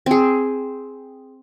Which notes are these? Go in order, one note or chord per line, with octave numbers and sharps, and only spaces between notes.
C4 G#4